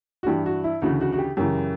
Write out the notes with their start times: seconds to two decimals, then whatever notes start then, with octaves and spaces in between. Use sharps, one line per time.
0.23 F#4
0.26 G2 E3 G4
0.46 F#4
0.64 E4
0.82 D2 C#3 E3 F#4
1.01 F#4
1.13 F#4
1.18 G4
1.37 F#2 C#3 E3 G4